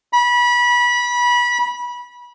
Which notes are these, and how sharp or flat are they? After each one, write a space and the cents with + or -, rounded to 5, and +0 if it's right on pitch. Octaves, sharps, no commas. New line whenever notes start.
B5 -25